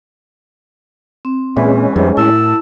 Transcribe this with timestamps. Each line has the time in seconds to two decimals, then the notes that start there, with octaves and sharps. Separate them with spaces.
1.25 C4
1.57 E2 A#2 E3 G#3 C#4
1.96 F2 G#2 C3 E3 G3
2.17 F#2 A2 E4 A5 E6